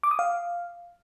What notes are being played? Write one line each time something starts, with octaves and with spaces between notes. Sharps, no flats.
D6
D#6
F5